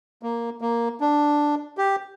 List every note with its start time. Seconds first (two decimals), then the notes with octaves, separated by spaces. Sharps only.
0.23 A#3
0.61 A#3
1.01 D4
1.78 G4